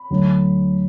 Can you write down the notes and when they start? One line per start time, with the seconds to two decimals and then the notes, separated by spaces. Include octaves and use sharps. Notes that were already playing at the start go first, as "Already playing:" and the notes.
Already playing: B5
0.10 D2 D3 F#3